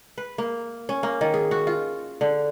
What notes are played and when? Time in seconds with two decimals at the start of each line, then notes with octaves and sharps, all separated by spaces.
0.18 B4
0.38 A#3
0.89 C#4
1.03 A#3
1.21 D#3
1.34 G#4
1.51 F#4
1.67 F4
2.21 D3